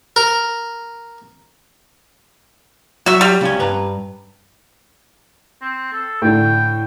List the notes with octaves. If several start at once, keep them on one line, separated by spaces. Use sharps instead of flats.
A#4
F#3 F#4 E5
G3
C#2 C#4 G#5
G2 B4 A#5
C4
A4
A2 D3 G5